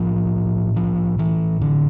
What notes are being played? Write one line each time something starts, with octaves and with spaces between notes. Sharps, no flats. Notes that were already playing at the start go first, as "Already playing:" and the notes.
Already playing: A1 A2 F3
F3
E3
D3